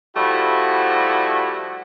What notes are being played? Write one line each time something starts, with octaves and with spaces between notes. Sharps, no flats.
F3 G3 A3 E4 F#4